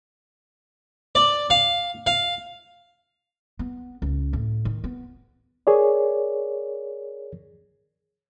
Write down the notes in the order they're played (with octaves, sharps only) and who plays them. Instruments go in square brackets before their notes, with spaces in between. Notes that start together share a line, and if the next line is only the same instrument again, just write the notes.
[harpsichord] D5
F5
F5
[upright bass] B3
C#2
A2
D#3
B3
[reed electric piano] G#4 A#4 C#5 D5